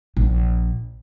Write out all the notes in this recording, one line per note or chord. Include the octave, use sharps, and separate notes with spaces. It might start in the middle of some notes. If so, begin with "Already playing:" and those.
A#1